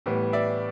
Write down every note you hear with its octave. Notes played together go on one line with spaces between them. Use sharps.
A2 E3 G3 B3
D5 E5